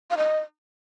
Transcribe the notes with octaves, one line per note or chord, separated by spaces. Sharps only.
F5
D#5